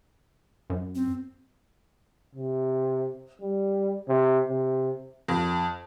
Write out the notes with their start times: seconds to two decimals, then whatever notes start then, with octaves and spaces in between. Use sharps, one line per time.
0.70 F#2
0.95 C4
2.35 C3
3.41 G3
4.09 C3
4.49 C3
5.28 F2